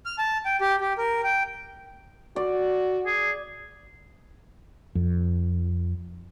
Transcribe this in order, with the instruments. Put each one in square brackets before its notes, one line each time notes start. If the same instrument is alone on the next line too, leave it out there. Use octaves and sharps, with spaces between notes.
[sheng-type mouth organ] F6
A5
G5
G4
G4
A#4
G5
[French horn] F#4 [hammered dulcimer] D5
[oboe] G#4
[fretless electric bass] F2